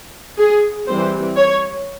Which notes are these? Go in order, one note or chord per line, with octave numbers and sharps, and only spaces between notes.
G#4
E3 G3 C4 C5
C#5